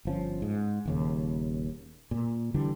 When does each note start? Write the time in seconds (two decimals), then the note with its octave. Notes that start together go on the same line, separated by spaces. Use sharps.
0.05 G1 F3 C#4
0.42 G#2
0.86 D#1 D#2 C#3
2.11 A#2
2.54 D3 E3 G3 D4